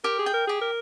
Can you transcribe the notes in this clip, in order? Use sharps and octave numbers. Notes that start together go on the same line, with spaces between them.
G4 A#4
G#4
G5
A#4
G4 G#4
A#4